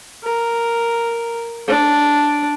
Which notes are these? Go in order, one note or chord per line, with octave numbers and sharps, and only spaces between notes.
A#4
D4